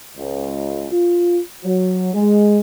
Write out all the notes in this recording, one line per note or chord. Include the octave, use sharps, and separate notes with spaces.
C#2
F4
F#3
G#3